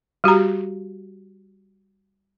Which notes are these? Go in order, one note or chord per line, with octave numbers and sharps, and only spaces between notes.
G3 F#4 G4 A#5